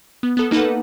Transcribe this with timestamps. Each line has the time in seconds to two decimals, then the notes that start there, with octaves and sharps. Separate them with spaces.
0.23 B3
0.37 B3 A4
0.51 A#3 D#4 A4 B4 F#5